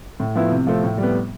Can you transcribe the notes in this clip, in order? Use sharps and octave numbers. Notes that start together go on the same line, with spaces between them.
A2
F3 B3 E4
C3
F3 A3 C4
A2
G3
B3